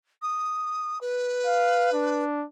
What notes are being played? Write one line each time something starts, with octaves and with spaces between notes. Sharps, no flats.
D#6
B4
F5
D4